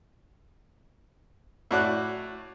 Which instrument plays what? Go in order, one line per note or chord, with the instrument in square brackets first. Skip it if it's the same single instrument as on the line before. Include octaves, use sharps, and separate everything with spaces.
[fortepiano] A2 F#4 D5 F#6